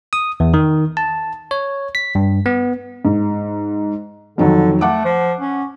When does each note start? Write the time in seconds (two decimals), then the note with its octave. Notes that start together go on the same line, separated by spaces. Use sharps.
0.13 D#6
0.40 E2
0.54 D#3
0.97 A5
1.51 C#5
1.95 B6
2.15 G2
2.46 B3
3.05 G#2
4.38 F2 D3 D#3 F#3
4.81 A3 F#5 D6
5.05 F3
5.40 C#4